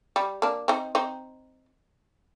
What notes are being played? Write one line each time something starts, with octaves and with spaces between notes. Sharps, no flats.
G3
A#3 D4
C4 D#4
C4 D#4